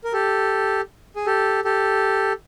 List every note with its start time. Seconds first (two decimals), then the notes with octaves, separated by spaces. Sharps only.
0.04 A#4
0.13 G4 A4
1.16 G#4
1.26 G4 A4
1.64 G4 A4